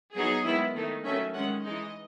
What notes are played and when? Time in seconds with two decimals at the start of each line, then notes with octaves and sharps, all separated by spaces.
0.15 F#3 B3 D#4 G#4
0.45 D#3 G#3 B3 E4
0.75 D#3 A3 D#4
1.05 D#3 F#3 A3 C#4 E5
1.34 D#3 G#3 C#4 F#5
1.64 E3 G#3 D#4 D#5